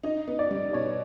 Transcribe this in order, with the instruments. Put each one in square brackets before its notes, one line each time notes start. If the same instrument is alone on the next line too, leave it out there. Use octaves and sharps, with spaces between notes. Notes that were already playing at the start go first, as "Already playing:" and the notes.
[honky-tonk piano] D#4 [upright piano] D#5
[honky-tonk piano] B3
[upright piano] D5
[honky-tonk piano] G3
[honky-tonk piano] B2 [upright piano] C#5